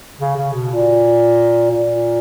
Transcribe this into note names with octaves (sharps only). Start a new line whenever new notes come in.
C#3
C#3
B2
A#2
A#2